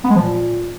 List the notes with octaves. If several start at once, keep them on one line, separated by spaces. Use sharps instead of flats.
B3
G#3
F3
A#2